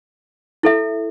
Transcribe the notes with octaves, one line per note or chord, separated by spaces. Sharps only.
E4 A4 E5